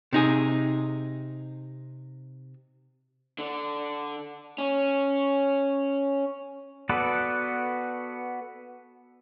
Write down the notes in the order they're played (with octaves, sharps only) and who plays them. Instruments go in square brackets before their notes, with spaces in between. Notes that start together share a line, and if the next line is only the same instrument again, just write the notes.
[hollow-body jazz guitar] C3 D#4 G#4
[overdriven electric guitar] D3
C#4
[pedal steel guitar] B3 F#4 A4 B4 D5